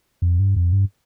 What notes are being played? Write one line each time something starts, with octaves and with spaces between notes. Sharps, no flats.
F2
G2
F2
G2